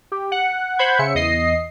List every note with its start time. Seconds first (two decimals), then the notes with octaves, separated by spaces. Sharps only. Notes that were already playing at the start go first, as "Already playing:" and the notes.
0.12 G4
0.32 F#5
0.79 C5 F#5 B5 G6 G#6
0.99 C#3 E5 C#7
1.15 E2 D#5 C7